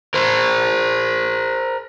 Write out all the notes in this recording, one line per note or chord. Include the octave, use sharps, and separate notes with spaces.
A#4 C5